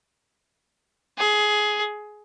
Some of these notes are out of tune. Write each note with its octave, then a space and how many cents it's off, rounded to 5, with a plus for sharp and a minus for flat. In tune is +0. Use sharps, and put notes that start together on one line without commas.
G#4 +15